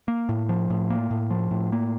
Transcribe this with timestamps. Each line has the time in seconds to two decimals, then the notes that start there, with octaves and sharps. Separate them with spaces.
0.08 A#3
0.29 A2
0.49 F3
0.70 A2
0.90 A#3
1.11 A2
1.30 F3
1.51 A2
1.72 A#3